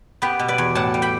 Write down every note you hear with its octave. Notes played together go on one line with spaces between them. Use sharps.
B3 G4 B4
B2
B4 D5
E2
A2 F#5 A5
G3
G5 B5